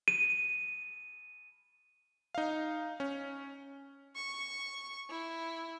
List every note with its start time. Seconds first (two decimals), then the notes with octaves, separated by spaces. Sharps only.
0.08 D#7
2.35 D#4 F5
3.00 C#4
4.15 C#6
5.09 E4